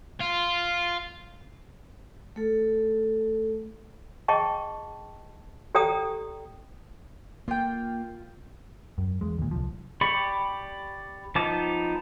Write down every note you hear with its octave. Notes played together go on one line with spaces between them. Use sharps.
F4
A3 A4
G#4 D#5 G5 A5 C#6
G4 A4 D5 G5 A#5 D#6
A#3 F4 G5
F#2
E2 G#3
D#2 A#2
C2 F3
G4 D5 B5 C#6
F3 B3 D#4 A5 D6